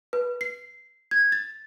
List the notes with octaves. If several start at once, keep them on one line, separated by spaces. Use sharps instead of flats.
B4
C7
G#6
A6